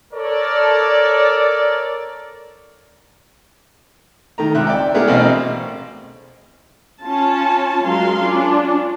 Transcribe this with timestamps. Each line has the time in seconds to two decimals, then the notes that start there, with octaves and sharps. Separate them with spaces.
0.14 A4 A#4 C#5 D5
4.38 D#3 A3 A#5
4.55 C#2 C3 E5 F#6
4.67 D5 G5
4.94 A3 B3 D4 E4 G#4 A#4
5.08 A1 B2 C4 D#5 F5
7.02 C#4 F4 A5
7.86 F#3 G#3 F4 A#4 F5 C6
8.22 C#4 D4 F4